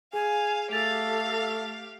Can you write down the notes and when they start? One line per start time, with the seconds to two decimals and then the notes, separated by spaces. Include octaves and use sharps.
0.13 G#4 F5 G#5
0.71 A3 G4 A4 F5 A6 F7